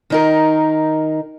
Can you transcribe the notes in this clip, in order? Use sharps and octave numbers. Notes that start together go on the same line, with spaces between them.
D#3 D#4 A#4